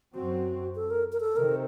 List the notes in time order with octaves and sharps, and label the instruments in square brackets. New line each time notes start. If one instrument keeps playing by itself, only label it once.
[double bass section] F#2 F#3 C4 [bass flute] F#4
[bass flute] A4
A#4
A#4
A4
[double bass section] C3 D#3 [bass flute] A#4